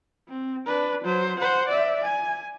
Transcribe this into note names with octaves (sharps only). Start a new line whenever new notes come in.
C4
D4 B4
F#3 C5
C5 F#5
D5 E5
G#5